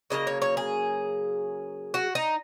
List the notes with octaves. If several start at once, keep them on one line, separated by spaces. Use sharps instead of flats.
C#3 F#3 A#3 D#5
C#5
C#5
G#4
F#4
D#4